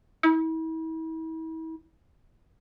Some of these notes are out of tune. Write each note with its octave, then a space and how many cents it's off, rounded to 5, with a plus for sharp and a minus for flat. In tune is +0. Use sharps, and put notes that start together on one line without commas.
E4 -40